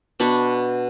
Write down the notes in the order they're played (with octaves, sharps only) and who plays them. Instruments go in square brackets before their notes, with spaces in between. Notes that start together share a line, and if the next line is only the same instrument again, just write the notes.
[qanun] B2 D4 B5 C#6